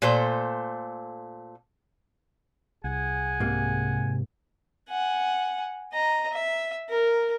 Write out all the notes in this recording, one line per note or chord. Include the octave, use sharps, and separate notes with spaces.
A#2 A3 A4 C5
C2 G#4 F#5 G#5
G#2 C3 A#3
F#5 G#5
D#5 A#5
E5
A#4